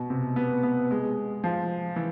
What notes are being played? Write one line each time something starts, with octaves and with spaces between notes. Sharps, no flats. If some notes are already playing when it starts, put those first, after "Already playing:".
Already playing: B2
C3
B3
B3
G#3
F3
E3